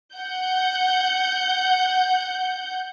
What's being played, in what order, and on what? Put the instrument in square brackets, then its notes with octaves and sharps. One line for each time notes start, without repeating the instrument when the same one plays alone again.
[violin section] F#5 G6